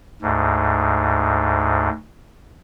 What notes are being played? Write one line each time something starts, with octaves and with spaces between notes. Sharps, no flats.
D2 G#2